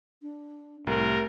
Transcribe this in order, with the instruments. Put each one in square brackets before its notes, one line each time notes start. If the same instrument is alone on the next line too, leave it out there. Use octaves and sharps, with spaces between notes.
[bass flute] D4
[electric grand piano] C2 [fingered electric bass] A2 [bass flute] G4 [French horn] A#4